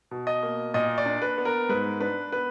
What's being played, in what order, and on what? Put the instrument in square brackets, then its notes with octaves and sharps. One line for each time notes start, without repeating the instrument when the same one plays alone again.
[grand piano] B2
D#5
A#3
A#2 D#5
D5
D4
B4
B3
A#4
G#2 B4
D4 B4
B3 B4